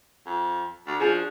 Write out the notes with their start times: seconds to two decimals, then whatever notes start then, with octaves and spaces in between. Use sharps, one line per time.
0.26 F2
0.87 D2
1.00 F3 D4 F#4 G#4